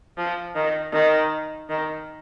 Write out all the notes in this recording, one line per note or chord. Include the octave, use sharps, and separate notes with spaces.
F3
D#3
D#3
D#3